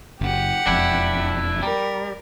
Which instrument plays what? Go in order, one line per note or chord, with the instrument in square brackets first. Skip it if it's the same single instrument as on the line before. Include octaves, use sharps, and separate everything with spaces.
[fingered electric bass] F#1 [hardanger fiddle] G4 F#5
[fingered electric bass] E1 F2 [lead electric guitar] D4 E4
[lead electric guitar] G3 [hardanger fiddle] A#4